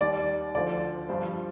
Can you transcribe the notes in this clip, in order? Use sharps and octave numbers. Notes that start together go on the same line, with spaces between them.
D#2 D#3 G3 D5
D2 D3 F3 D5
G2 F3 C5